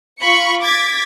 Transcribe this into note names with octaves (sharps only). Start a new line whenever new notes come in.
F4 B5 C#6 C#7
D6 G#6 A6 B6